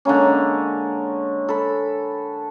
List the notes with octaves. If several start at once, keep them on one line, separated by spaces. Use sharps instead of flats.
D3 G#3 A#3 C#4
A4 B5